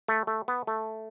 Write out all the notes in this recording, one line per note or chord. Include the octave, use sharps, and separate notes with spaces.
A3
A3
B3
A3